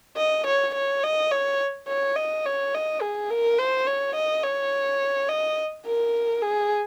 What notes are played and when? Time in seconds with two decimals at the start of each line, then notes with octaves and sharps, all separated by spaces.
0.17 D#5
0.47 C#5
0.75 C#5
1.03 D#5
1.31 C#5
1.88 C#5
2.16 D#5
2.46 C#5
2.74 D#5
3.01 G#4
3.30 A#4
3.59 C5
3.87 C#5
4.15 D#5
4.43 C#5
5.29 D#5
5.86 A#4
6.42 G#4